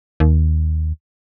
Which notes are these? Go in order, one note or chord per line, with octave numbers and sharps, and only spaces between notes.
D#2